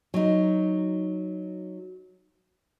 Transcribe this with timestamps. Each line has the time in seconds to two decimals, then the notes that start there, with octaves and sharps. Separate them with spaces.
0.14 F#3 D#4